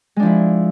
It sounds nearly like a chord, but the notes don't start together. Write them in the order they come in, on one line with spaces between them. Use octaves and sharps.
G#3 D4 F3 E4